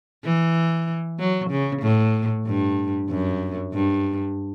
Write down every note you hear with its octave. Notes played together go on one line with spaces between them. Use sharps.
E3
F#3
C#3
A2
G2
F#2
G2